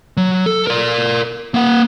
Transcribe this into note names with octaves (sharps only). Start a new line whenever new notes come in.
F#3
A4
A#4 D5
A#3 F#5